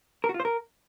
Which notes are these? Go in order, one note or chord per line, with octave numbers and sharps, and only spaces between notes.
A#4
F#4
F4
C5
A#4